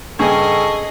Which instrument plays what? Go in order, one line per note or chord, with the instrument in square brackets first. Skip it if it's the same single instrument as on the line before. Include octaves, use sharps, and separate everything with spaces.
[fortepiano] G2 C#3 G#5 [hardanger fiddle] G#4 D#5 [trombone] A4 [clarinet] C#6